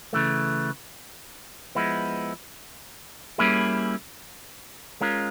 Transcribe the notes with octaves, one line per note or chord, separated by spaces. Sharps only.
C#3 E3 A3
F3 G#3 B3 E4
G3 A#3 C#4 E4 G#4
G#3 C#4 F4 A#4